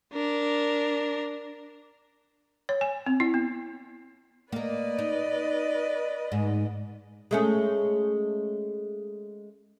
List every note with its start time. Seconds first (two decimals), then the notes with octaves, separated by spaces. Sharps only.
0.13 D4 A#4
2.69 C#5
2.81 G#5
3.06 C4
3.20 E4
3.34 B3
4.52 A#3 A#4 B4 D5 D#5
4.99 D#4
6.32 G#2
7.31 G#3 A3 C#4